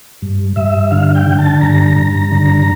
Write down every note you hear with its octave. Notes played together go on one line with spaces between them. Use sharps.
G2
G2 E5
D3 F5
G5
D3
A5
G2 A#5
G2
D3